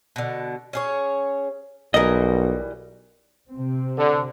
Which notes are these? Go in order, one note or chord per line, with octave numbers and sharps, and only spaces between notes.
B2 D3
C#4 G#4 C#5
B1 E3 G3 A#4 D#5
C3 C4
D3